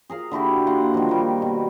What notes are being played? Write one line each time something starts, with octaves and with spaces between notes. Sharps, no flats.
G#4 A#4 F5
D3 E4 F#4 G4
A#3 F#5 C6
D#3 F3
G3 A#3
B2